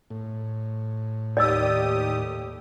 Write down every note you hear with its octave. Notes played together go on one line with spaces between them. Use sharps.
A2
D#2 G4 D5 D#5 D#6 E6